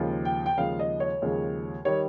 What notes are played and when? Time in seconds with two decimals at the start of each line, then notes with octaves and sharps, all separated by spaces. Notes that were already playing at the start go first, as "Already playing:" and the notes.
Already playing: D#2 C#3 F3 G#3
0.25 G5
0.46 G5
0.57 D#2 C#3 F3 G#3 F5
0.79 D#5
1.00 C#5
1.22 D#2 C#3 F3 G#3
1.85 D#3 G3 C#5